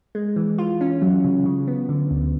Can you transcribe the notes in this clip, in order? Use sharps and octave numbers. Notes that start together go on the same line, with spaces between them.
G#3
E3
F4
C#4
F#3
C#3
C#3
B3
D3
D2